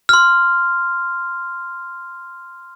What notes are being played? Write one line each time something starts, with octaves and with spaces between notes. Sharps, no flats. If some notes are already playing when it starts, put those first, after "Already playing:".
C6 F6